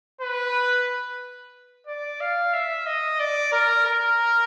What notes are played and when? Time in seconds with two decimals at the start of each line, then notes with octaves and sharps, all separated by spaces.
0.21 B4
1.87 D5
2.20 F5
2.53 E5
2.86 D#5
3.20 D5
3.52 A#4
3.86 A#4